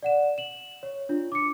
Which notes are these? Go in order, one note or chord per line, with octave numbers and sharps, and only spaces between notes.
D5 F#5 E7
E7 F#7
C#5
D4 F4
D6 C#7